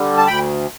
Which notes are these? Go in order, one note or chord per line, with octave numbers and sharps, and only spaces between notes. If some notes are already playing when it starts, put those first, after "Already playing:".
Already playing: D3 G3
A5
D2 G5 B5